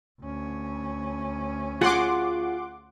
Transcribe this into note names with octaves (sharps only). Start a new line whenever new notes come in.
D2 C#4
F4 F#4 G#4 F#5 C6 D6